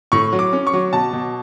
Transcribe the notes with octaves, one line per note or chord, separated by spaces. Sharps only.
A2 C#6
F#3
D6
C#4
C#6
F#3
B2 A5
B2